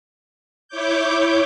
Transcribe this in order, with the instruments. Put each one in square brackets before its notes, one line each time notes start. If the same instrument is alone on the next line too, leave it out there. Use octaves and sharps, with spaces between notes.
[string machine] E4 C#5 D6 G6